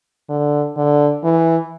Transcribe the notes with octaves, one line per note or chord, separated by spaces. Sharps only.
D3
D3
E3